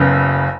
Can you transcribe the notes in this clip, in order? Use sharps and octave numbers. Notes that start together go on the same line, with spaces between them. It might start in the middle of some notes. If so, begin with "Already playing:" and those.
Already playing: F#1 F#2 C#3 B3